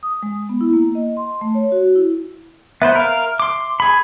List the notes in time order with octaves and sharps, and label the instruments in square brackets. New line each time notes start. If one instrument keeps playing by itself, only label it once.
[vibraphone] D#6
G#3
B3
E4
A#3
D#5
C6
A3
C#5
F#4
E4
[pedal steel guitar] B3 B4 C5 [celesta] E5
[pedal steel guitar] A#4 F5
C6 D6
G#4 B5